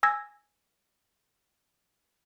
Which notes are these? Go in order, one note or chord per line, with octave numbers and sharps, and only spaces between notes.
G#5 E6 G#6 A#6